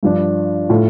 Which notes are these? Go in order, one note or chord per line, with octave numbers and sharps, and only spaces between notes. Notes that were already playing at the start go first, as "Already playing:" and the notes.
G2 F3 D4
A2 A3 F4